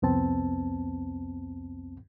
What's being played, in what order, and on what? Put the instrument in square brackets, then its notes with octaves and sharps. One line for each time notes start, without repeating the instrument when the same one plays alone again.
[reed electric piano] C2 F2 B3 C4 A5